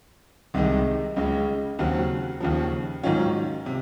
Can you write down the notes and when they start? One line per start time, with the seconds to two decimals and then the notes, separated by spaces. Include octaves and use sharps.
0.54 C2 C3 D#3 G#3 D#4
1.16 C#2 C#3 G#3
1.79 D#2 C#3 F#3 C4 F#4
2.40 D#2 C#3 F3
3.03 G#2 D#3 F#3 C#4 F4
3.66 C3